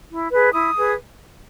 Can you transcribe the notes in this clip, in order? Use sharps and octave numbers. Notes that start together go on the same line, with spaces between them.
E4
G#4 B4
E4 D#6
G#4 B4